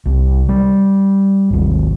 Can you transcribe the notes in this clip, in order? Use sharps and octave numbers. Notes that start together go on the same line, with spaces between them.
C2
G3
G#1 D#2